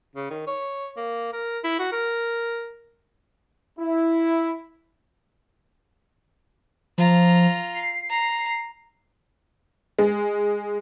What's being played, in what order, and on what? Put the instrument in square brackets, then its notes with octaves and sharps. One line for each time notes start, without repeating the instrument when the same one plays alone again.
[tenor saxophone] C#3
D#3
C#5
A#3
A#4
E4
F#4
A#4
[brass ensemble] E4
[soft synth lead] F3 [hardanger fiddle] F4 A#5
[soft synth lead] C7
[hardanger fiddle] A#5
[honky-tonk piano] G#3